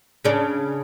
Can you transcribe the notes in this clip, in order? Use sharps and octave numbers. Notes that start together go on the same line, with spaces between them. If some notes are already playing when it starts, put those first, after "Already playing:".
C#3 D4